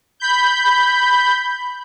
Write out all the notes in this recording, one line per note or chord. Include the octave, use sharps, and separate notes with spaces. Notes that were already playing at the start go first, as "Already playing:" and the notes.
B5 G6